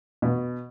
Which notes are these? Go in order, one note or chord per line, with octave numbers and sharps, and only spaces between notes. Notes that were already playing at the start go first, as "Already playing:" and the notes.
B2